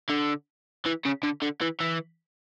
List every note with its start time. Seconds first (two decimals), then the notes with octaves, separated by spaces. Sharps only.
0.09 D3
0.86 E3
1.05 C#3
1.23 D3
1.42 D3
1.61 E3
1.80 E3